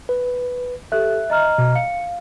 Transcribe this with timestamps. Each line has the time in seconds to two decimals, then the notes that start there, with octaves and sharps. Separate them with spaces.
0.09 B4
0.92 G4 A4 E5 F#6
1.30 D#5 A#5 F6
1.58 B2
1.75 F5 C#7